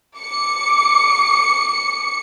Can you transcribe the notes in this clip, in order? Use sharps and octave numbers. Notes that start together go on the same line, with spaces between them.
D6 C#7